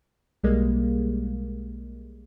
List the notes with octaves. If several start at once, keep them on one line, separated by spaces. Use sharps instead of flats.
B1 G3 G#3 A#3